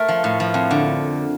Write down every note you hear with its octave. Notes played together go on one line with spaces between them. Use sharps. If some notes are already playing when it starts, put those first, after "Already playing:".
Already playing: A3 A#4
F3
A2
F3
F2
D3